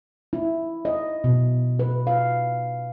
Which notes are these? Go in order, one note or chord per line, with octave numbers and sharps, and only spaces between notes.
E4
D#5
B2
B4
F5